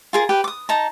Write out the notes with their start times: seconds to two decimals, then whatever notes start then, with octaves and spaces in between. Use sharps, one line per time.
0.13 F4 G#4 A#4
0.29 G4 B4 G5
0.44 D6 D#6
0.69 D#4 A5 A#5